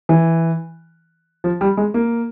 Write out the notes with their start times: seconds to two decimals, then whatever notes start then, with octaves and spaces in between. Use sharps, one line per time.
0.09 E3
1.44 F3
1.61 G3
1.77 G#3
1.94 A#3